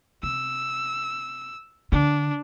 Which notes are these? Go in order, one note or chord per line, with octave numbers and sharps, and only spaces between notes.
C3 E6
D3 D4